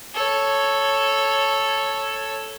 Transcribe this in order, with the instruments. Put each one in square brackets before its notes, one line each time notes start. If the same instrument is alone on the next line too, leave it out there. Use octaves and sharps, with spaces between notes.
[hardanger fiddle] A4 C#5